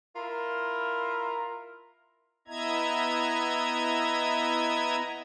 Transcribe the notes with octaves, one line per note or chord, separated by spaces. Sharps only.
E4 F4 A#4
B3 E4 D#5 E5 A#5 G#6